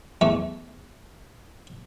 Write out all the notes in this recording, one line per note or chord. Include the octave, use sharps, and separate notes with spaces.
E2 A3